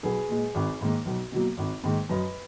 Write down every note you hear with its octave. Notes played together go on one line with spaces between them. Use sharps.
B1 G#4 B4
A#2 G#3
G#1
G#2 D#3 A#3
B1
B2 F#3 A#3
G#1
G#2 D#3 A#3
F#2 B4 D#5